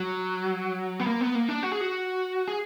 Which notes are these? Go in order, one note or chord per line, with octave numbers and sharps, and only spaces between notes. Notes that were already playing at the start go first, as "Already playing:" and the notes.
Already playing: F#3
B3
A#3
B3
A#3
D4
F#4
G#4
F#4
G#4